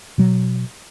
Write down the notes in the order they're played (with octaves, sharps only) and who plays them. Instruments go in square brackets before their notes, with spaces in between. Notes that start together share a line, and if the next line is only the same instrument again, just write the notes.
[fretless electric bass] B2 F#3